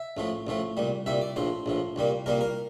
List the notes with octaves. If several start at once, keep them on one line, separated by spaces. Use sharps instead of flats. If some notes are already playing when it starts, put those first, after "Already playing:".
Already playing: E5
A1 A2 F3 A3
A1 A2 F3 A3
C2 A#2 G3
C2 A#2 G3 E5
D5
A#1 A2 F3 C5
A#1 A2 F3
C2 A#2 G3 A#3
C2 A#2 G3 A#3 A#4
A#4